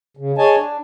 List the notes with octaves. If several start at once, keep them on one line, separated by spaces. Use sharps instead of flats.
C#3
G#4 C#5 D#5 G#5 A5
D4